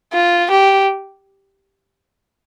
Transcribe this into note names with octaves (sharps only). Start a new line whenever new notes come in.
F4
G4